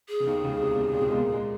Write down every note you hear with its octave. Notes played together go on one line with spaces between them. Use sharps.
G#4
C#3
D#2 D#3
C#2 C#3
C3
A#2
A#2
C3
G#3
A#2 A#3
G#3